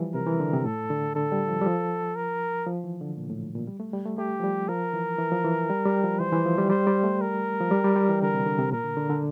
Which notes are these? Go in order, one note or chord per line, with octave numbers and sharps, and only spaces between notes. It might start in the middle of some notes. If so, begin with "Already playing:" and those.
Already playing: E3 F3 G3
C3 A#4
E3
D3
C3
A2 A4
D3
D3 A4
G3
F3
G3
F3
A#4
F3
E3
D3
A#2
A2
A#2
G3
A3
G3
A3
A3 G4
F3
G3
F3 A#4
E3
E3
F3
E3
G3
G3
F3
E3 C5
E3
F3
G3
G3 C5
G3
A3
A#4
F3
G3
G3
G3
E3
D3 A#4
C3
D3
C3
A#2 A#4
D3
D3
D3